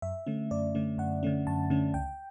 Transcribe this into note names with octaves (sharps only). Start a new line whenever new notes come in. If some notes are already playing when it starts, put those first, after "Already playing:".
F#2 E5
D3 A3 C#4
F#2 D5
D3 A3 C#4
F#2 F#5
D3 A3 C#4
F#2 A5
D3 A3 C#4
C#2 G5